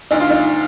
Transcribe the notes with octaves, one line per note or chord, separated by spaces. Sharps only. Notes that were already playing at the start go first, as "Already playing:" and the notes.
D2 D#4
F4
D#4